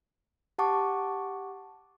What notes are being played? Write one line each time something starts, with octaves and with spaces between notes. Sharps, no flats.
G4 F#5 A5 C#6 D6